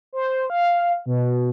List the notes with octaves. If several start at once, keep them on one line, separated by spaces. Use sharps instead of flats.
C5
F5
B2